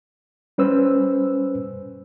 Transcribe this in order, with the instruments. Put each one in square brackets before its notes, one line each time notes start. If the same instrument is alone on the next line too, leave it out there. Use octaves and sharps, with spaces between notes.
[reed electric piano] G3 C#4 B4 C5 E6